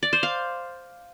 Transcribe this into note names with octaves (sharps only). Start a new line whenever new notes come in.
D5
C5
F5